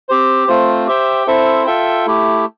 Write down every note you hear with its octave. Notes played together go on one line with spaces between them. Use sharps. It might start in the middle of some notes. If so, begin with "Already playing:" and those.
C4 G4 C5
A3 C4 F4 C5
G4 C5 E5 G5
C4 E4 A4 C5 E5
F4 A4 E5 G5
A3 E4 G4